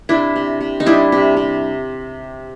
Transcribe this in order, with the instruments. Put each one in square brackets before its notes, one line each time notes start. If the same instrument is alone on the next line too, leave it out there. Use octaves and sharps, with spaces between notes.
[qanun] C3 D4 E4
C3
C3
D#4
G3 D4 E4
C3
C3